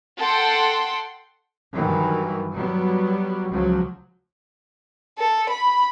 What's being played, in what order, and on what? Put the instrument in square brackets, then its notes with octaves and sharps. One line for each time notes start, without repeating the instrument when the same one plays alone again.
[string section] A4 F#5 G5 C6
[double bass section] G2 D#3 E3 F#3
F#3 G3 B3
C#2 F3 F#3
[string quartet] A4
B5